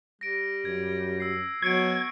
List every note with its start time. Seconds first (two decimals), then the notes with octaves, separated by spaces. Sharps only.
0.21 G3 A#6 D7
0.65 F#2 G#6
1.20 E6 C7
1.62 B2 F#3 C#6 G#6 C#7 D7